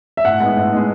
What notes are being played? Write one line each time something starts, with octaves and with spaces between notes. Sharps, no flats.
E5
A2 F#5
G#3 B3 D#4 F#5
A2
G#3 B3 D#4